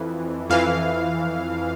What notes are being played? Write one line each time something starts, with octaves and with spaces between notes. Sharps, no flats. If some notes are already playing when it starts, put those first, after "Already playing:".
Already playing: F2 E3
F2 E3 F5